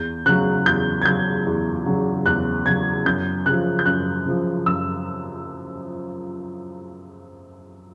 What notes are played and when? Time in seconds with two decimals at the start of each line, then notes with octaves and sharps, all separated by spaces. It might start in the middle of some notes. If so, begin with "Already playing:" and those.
Already playing: E2 G6
0.26 C#3 F#3 F#6
0.66 E2 G6
1.02 G#6
1.05 C#3 F#3 G6
1.46 E2
1.86 C#3 F#3
2.26 E2 F#6
2.66 C#3 F#3 G#6
3.05 F#2 G6
3.46 C#3 F3 F#6
3.79 G6
3.86 F#2 F#6
4.26 C#3 F3
4.66 F#2 E6